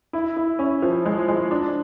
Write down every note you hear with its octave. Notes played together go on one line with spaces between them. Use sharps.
E4
E4
C#4
F3
G#3
G#3
D4